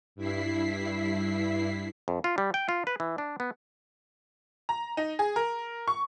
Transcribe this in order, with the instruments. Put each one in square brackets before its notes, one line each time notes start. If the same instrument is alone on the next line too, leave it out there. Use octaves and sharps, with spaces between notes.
[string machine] G2 E4 B6 C7
[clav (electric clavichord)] F2
F4
G3
G5
F4
B4
E3
D4
B3
[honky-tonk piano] A#5
D#4
G#4
A#4
C#6